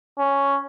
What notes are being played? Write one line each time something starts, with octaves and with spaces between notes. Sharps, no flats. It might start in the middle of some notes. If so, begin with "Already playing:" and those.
C#4